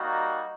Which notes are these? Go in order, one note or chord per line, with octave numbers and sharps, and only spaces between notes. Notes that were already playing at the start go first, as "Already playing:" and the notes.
Already playing: G3 A#3 D#4 F#4